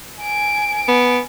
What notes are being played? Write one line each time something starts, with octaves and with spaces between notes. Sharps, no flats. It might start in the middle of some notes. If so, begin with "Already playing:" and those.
G#5 D7
B3